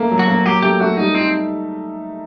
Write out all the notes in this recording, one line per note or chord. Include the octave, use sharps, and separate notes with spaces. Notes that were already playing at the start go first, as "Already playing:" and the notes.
Already playing: A3 A#3
F#3
F#4
A#3
F#3 G4
A3 G4
A3 F#4
G3 D#4
C4 D#4